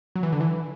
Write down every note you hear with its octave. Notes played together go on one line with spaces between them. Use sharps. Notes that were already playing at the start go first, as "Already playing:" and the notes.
F#3
E3
D3
E3